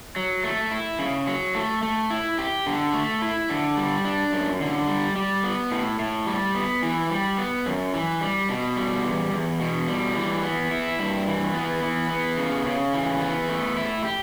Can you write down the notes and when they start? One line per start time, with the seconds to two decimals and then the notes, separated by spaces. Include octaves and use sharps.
0.16 F#3
0.44 A3
0.71 E4
0.99 C#3
1.27 F#3
1.55 A3
1.83 A3
2.10 E4
2.38 G4
2.67 D3
2.94 A3
3.22 E4
3.49 D3
3.77 G3
4.05 D4
4.33 F#2
4.60 D3
4.88 G3
5.16 G3
5.44 B3
5.71 A2
5.99 A2
6.27 G3
6.55 B3
6.83 E3
7.10 G3
7.38 B3
7.66 F#2
7.94 E3
8.21 G3
8.49 B2
8.77 G3
9.05 E2
9.32 E2
9.60 B2
9.88 G3
10.15 E3
10.43 B3
10.71 E4
10.99 G2
11.27 E3
11.54 B3
11.83 E3
12.10 B3
12.38 C#3
12.66 C#3
12.93 E3
13.21 B3
13.49 A3
13.77 E4
14.04 G4